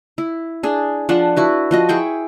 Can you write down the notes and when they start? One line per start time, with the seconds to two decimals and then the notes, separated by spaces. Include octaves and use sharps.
0.18 E4
0.63 D4 G#4
1.09 F3 D4 F#5
1.36 E4 F#4 B4
1.71 F3 F#4 D#5
1.89 E4 G#4 G5 C#6